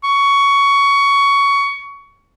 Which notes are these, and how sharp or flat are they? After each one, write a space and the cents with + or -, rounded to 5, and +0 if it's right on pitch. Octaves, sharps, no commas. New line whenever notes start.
C#6 +15